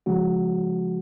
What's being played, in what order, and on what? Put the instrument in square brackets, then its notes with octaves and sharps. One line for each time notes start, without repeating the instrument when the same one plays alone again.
[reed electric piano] C#3 F3 G#3 C#4 F#4